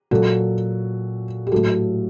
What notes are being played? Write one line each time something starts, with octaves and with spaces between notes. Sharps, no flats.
A#2 F#3 F#4 A4
G4
A2 F#3 F#4 A4